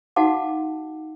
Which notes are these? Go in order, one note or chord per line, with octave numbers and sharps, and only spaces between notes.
D#4 F#4 F5 F#5 A5 D6